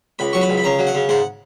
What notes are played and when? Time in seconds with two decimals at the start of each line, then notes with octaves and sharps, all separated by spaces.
0.19 C#2 B5
0.33 F#3 C#6
0.41 B5
0.49 C#2
0.58 B5
0.64 C#3 A#5
0.79 F#3
0.87 F#5
0.95 C#3
1.09 G#2 F#5